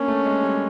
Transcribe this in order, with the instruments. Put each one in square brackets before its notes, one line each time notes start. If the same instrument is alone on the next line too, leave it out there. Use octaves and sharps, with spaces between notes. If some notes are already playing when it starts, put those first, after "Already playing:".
Already playing: [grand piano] A#3 D4 [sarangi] C#4
[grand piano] A3
G#3
G3